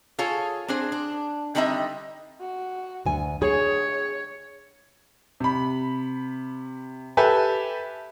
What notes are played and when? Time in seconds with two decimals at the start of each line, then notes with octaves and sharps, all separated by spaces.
0.19 F4 G#4 A4 C#5
0.68 C4 D4 G#4 C5
0.92 D4
1.55 D3 G3 C4 D#4 D#5 E5
2.41 F#4
3.06 D2 G#5
3.42 G#4 C#5
5.40 C3 B5
7.17 G4 A4 B4 E5 G#5